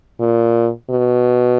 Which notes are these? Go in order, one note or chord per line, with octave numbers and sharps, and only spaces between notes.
A#2
B2